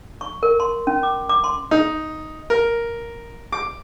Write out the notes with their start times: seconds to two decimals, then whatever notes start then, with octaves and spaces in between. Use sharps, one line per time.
0.21 C#6
0.43 A#4
0.60 C6
0.87 C#4
1.03 D6
1.29 D6
1.44 C6
1.71 D#4
2.50 A#4
3.52 D6